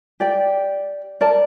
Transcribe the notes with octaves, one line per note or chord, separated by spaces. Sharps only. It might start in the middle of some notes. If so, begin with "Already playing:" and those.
G4 D5 G5
A#4 D5 A5